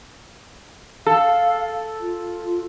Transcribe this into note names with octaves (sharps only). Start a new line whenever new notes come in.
A4 F5
F4